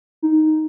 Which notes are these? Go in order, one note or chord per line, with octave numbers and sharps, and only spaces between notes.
D#4